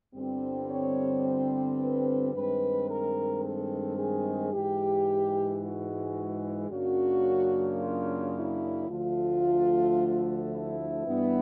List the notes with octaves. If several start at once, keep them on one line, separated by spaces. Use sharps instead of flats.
G1 G2 D3 G3 C4
C#5
C5
B4
G2 D#3 G#3 C4 B4
A#4
A4
G#4
G#2 E3 G#3 G4
F#4
F#2 C#3 F#3 A#3 D4 F#4
F4
E4
D2 D3 F3 A3 F4
E4
G2 E3 G3 B3